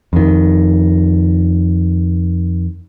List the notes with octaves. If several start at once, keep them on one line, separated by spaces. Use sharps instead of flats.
F2 D#3